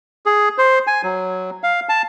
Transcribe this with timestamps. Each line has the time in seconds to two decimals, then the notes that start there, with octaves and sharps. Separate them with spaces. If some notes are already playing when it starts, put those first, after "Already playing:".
0.26 G#4
0.58 C5
0.87 G#5
1.03 F#3
1.63 F5
1.89 A5